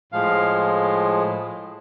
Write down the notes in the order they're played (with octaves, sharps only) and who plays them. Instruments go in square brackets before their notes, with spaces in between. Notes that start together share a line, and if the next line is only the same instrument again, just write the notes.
[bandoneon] A2 F3 G#3 F5